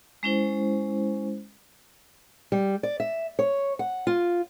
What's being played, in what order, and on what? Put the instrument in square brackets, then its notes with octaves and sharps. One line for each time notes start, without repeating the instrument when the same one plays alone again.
[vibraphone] G#3 C#4 E4 C5
[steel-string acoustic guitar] G3
D5
E5
C#5
F#5
F4